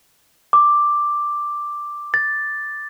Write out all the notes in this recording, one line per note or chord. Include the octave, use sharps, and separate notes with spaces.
D6
A6